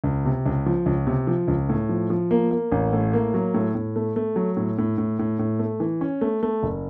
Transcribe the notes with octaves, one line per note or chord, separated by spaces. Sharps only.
C#2
C3
C#2
F3
C#2
C3
F3
C#2
A2
F3
F3
A#3
A#3
A1
A2
A#3
F#3
A2
A2
A3
A3
F#3
A2
A2
A2
A2
A2
A3
E3
C#4
A3
A3
F#1